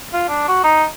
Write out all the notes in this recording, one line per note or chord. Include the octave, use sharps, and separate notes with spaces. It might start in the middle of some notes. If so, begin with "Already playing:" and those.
F4
D4
F#4
D#4